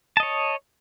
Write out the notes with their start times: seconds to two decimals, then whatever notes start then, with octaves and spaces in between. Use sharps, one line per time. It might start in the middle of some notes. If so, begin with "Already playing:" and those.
0.17 A5
0.20 D#5
0.23 C#5